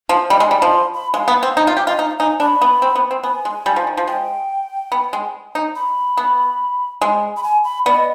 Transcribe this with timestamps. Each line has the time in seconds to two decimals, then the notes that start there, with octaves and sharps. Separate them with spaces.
0.09 F3
0.30 G3 D#5
0.40 G#3 D#5
0.51 G3 D5
0.62 F3 D#5
0.72 C6
0.94 B5
1.14 G#3 F5
1.28 B3
1.43 C4
1.57 D#4
1.67 F4
1.77 G4
1.87 F4 D#5
1.98 D#4 F5
2.19 D#4 G#5
2.40 D4 B5
2.61 B3
2.82 C4
2.95 B3
3.11 C4
3.23 B3 G#5
3.45 G#3
3.66 G3
3.76 F3
3.87 D#3
3.97 F3
4.07 G#3 G5
4.92 B3
5.13 G#3
5.55 D#4
5.76 B5
6.17 B3
7.01 G#3
7.37 B5
7.43 G#5
7.64 B5
7.86 B3 D5
7.96 D#5